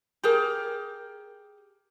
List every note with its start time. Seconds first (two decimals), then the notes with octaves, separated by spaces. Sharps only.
0.24 G4 G#4 A#4